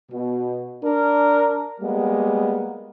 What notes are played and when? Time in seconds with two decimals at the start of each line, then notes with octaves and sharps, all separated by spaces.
0.11 B2
0.82 D4 A#4
1.81 G3 G#3 A#3 B3